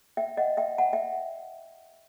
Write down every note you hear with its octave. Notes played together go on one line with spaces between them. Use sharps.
E5 G5
D#5 F#5
E5 G5
F#5 A5
E5 G5